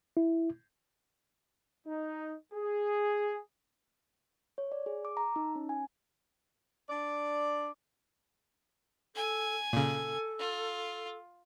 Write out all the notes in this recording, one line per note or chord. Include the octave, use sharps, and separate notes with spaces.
E4
D#4
G#4
C#5
D5
G#4
D6
A#5
D#4
C#4
G#5
D4 D5
A4 G#5
A#2 C#3 A4
F4